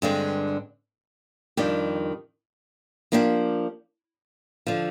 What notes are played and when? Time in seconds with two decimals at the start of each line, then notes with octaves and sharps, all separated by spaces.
0.02 G2 D3 G#3 C4
1.57 F2 D#3 G3 D4 G4
3.12 F3 A#3 D4 G4
4.67 D3 F3